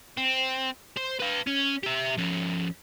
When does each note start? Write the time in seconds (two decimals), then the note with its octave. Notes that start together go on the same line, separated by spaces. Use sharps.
0.18 C4
0.97 C5
1.20 B4 F5
1.47 C#4
1.83 G4 E5
2.17 F3 C#4